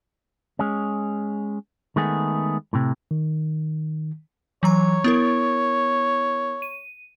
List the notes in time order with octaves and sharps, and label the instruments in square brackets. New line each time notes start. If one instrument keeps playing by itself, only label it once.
[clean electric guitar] G#3 C#4
D#3 G#3 A3 B3 G#4
A2 C3
[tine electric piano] D#3
[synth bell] E3 F#3 A#5 [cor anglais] C#5
[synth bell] B3 E4 A#4
D#7